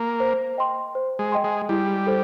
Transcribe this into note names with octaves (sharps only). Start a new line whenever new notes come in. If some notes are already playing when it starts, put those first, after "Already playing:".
Already playing: A#3
C5
D#5 G5 C6
C5
G#3
D#5 G5 C6
G#3
G3 E4
A4 C5